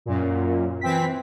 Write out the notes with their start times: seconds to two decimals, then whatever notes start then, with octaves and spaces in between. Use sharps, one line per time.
0.06 F#2 A#2
0.81 E3 C4 B6